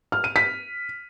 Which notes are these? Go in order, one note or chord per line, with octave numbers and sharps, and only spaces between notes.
F6
D#7
B6